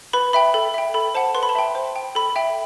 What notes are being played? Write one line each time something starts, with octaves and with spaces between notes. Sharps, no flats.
B4 B5
E5 G5 B5
A4
E5 G5
A4 B5
C5 F#5 A5
B4 C6
B5
A5
E5 G5 B5
C5
G5
A4 B5
E5 G5